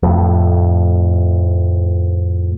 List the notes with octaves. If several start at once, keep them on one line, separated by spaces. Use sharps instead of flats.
F2 A2